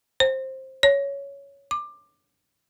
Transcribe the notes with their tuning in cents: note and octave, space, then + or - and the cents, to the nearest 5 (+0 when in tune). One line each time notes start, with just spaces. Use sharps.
C5 +15
C#5 +10
D6 +20